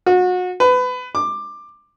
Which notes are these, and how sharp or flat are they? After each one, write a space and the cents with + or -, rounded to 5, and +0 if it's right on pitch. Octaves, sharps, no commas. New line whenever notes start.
F#4 -30
B4 +25
D6 +15